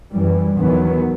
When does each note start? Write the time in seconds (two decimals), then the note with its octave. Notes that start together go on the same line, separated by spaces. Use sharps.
0.13 F#2 E3 G3
0.58 E2 D#3 F#3 B3